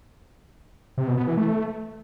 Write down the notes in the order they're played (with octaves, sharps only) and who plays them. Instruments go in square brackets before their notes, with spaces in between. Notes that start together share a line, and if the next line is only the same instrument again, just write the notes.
[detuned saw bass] C3
B2
B3
E3
A3